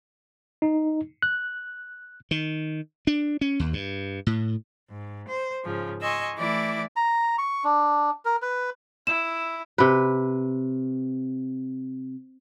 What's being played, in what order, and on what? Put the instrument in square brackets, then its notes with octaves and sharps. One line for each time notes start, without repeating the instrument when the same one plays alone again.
[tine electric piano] D#4
F#6
[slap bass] D#3
D4
C#4
D#2
G2
A2
[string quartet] G#2
C5
G#2 C#3 F3
D#5 G#5 C6 C#6 E6
E3 A3 E4 D5 D6
[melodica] A#5
C#6
D4
A#4
B4
[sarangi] E4 [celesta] E7
[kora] C3 B4